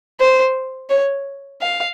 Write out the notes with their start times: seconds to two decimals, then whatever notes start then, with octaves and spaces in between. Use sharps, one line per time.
0.20 C5
0.90 C#5
1.61 F5